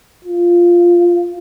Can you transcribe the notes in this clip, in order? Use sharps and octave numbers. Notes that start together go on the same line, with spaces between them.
F4